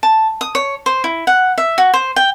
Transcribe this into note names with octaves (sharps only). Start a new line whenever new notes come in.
A5
D#6
C#5
C5
E4
F#5
E5
F#4
C5
G5